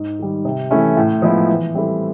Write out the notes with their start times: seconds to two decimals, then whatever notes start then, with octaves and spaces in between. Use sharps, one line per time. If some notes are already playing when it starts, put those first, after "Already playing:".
Already playing: G#2
0.19 D#3 G3
0.45 C3
0.70 E3 A3 C#4 E4
0.97 A2
1.22 F3 G#3 B3 E4
1.48 E3
1.75 G3 C4 E4 A4